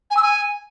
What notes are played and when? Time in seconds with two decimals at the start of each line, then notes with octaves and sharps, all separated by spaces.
0.11 G#5
0.17 E6
0.23 G#5